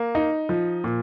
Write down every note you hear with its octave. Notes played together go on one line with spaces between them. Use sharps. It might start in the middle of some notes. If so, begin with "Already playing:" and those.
Already playing: A#3
D#4
F3
A#2